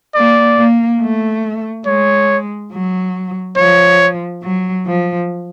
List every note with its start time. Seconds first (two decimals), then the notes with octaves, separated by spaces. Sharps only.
0.15 A#3 D5
0.57 A#3
1.01 A3
1.86 G#3 C#5
2.71 F#3
3.57 F3 C#5
4.42 F#3
4.86 F3